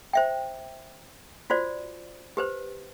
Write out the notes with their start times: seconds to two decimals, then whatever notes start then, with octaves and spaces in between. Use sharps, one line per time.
0.13 C5 E5 G5
1.50 F4 F#4 C5 D5
2.37 G4 B4 C5